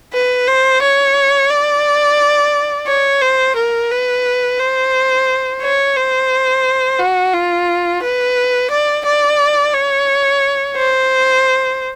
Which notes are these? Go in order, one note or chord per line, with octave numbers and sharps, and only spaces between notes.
B4
C5
C#5
D5
C#5
C5
A#4
B4
C5
C#5
C5
F#4
F4
B4
D5
D5
C#5
C5